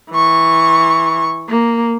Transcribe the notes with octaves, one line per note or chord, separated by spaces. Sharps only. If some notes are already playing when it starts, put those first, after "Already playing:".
E3 C#6
A#3